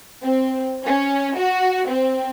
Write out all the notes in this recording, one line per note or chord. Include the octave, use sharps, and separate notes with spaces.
C4
C#4
F#4
C4